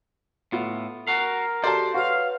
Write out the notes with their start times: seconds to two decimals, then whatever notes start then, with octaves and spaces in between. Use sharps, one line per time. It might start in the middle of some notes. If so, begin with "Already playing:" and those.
0.52 A2 B3 F4
1.07 F#4 A#4 F5
1.64 F#4 G4 A4 C5 D5 A5
1.94 F#4 B4 C#5 F5